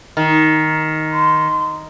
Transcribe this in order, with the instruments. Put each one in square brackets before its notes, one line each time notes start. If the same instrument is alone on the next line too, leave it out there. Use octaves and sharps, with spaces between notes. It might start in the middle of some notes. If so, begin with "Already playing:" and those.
[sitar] D#3
[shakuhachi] C6